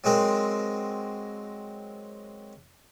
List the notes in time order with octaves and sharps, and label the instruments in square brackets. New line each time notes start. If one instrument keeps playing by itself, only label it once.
[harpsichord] F#3 G#3 C4 A#4